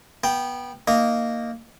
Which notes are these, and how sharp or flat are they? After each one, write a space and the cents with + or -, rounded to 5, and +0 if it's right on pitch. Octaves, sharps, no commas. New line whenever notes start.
B3 -20 G5 +0
A#3 -10 D#4 -10